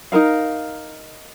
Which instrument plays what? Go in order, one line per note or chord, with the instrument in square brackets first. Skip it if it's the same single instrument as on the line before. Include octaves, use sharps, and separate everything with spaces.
[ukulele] D#4 F4 A#4 F5